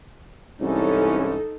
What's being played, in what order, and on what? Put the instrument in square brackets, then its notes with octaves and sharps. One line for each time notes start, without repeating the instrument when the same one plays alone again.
[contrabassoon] C2 [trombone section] G#2 E3 C#4 [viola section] D#4 A4